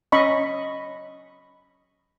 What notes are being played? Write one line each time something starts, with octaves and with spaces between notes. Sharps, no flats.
C#4 D#5 B5 C#6